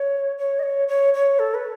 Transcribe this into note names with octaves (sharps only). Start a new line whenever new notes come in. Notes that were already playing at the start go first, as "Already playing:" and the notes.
Already playing: C#5
C#5
D#5
C#5
C#5
C#5
A4
B4